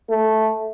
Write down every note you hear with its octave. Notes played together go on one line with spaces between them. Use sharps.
A3